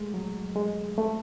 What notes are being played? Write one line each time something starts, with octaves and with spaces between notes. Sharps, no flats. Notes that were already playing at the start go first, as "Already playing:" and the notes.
Already playing: G#3 A3
F#3
G#3
A3